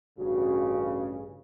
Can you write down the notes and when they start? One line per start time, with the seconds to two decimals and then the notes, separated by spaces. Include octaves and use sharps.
0.18 A1 G2 C#3 F#4